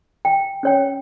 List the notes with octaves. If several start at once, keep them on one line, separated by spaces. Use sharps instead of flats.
G5
C#4 C#5 G5